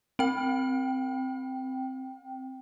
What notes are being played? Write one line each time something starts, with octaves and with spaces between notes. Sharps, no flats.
C4 G5